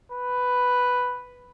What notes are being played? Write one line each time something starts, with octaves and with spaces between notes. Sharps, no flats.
B4